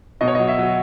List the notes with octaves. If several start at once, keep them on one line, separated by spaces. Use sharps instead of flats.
B2 D#5
C#5
F#3 D#5
E5
F#3